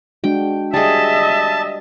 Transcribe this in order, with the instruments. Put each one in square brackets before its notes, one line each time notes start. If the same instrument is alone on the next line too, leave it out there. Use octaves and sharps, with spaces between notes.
[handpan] G#3 D4 F#4 [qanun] G5
[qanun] G3 G#4 [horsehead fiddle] D#5 E5 [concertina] A5